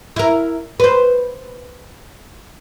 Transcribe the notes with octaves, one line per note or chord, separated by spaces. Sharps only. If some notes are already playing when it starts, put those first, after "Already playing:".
E4 A#4
B4 C5